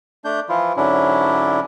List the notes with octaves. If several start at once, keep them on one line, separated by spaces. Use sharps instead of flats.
A3 D4 G6
E3 F3 E4 F4
G#2 D3 F#3 C#4 D4 E4